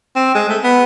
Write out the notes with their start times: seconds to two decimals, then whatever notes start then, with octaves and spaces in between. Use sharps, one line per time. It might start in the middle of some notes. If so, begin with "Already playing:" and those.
0.16 C4
0.35 G#3
0.49 A3
0.63 B3